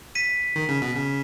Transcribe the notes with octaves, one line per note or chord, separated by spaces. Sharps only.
B6 D#7
D#3
C#3
B2
C#3